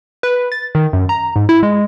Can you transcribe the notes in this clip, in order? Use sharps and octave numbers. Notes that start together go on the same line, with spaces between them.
B4
A6
D#3
F#2
A#5
G#2
E4
G#3